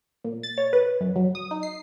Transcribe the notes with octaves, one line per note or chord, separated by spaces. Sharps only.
A#2
A6
C#5
B4
F#2
F#3
D#6
D#4
C7